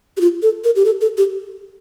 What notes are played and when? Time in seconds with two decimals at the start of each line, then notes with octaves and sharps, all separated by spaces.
0.17 G4
0.21 F4
0.42 A4
0.64 A#4
0.76 G4
0.85 A4
1.01 A4
1.18 G4